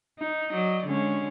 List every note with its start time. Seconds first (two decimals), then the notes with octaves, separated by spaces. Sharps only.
0.19 D#4
0.50 F#3 D5 D#5
0.85 D3 G#3 C#4